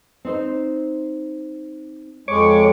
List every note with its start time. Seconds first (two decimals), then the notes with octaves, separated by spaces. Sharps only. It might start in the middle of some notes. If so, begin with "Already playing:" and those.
0.25 C4 D#4 C5
2.28 F2 G#3 C#5 C#6 D6